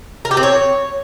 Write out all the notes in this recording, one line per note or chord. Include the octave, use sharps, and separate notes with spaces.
A#4
G4
C4
C#5